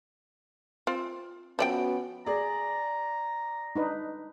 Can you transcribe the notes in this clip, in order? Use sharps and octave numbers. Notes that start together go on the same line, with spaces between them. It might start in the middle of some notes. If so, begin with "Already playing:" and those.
C4 F4
F3 B3 C#4 F#4 D5 G5
G#4 D5 A#5
D4 D#4 B4